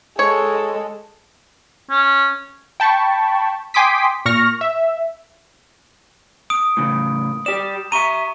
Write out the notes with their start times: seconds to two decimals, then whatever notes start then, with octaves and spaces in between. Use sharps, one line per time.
0.19 G#3 A4 C#5
1.90 C#4
2.80 G5 A5 B5 C#6
3.74 G5 G#5 C6 D6 D#6 B6
4.26 A#2 C#6 F6 A#6
4.61 E5
6.50 D#6 D7
6.77 A2 C#3
7.46 G4 D5 E7
7.92 E5 A#5 C#6 D#7